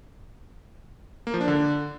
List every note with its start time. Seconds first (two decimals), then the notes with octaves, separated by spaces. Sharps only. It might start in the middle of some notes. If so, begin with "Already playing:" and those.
1.27 A#3
1.34 F3
1.41 D4
1.48 D3